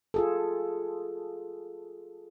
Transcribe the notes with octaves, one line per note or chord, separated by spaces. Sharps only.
F4 G#4 A4